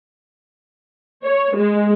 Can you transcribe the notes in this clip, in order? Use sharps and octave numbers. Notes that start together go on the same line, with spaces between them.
C#5
G#3